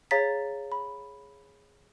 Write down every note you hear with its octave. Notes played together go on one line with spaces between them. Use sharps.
G#4 C#5 F5 A#5 A6 B6
B5